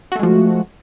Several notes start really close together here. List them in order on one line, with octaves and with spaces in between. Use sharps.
F#4 A3 G#3 F3